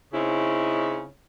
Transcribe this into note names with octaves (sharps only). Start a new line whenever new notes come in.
C#3 C4 C#4 D#4 E4